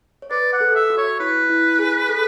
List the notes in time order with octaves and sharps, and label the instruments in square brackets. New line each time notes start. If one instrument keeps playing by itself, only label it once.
[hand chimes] C#5
[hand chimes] B4 [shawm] D5
[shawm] F#5
[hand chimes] A4
[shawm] E5
[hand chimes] F#4
[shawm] C#5
[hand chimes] E4 [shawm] B4
[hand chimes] E4
G#4
A4